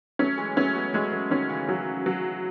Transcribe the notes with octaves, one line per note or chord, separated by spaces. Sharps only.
F#3 A3 C#4
E3 G#3
F#3 A3 C#4
G#3 B3
F#3 G#3 A3
F#3 A3
D#3 F#3 C#4
C#3 E3
F#3
F#3